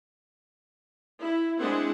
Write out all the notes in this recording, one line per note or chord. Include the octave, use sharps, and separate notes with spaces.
E4
G#3 C4 D4 E4 G#4 F#5